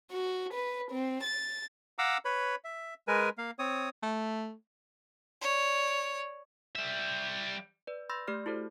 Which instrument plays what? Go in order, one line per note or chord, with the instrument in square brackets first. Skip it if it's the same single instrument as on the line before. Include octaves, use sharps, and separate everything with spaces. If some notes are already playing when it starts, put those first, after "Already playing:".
[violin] F#4
B4
C4
A6
[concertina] F5 F#5 A#5 D6 E6
B4 C#5 B5
E5
G#3 A#4 B4 G#5
A#3 F5
C4 C#5 D#6
[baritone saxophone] A3
[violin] C#5 D5
[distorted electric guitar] G3 E5
[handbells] B4 D5
B5 C6 E6 G6 A6 A#6
A3 G4 D5 F6
E4 F#4 A4 C5 D5